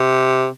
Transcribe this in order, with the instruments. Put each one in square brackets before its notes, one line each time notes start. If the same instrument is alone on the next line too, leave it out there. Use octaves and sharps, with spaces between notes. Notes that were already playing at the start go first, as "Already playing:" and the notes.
Already playing: [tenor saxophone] C3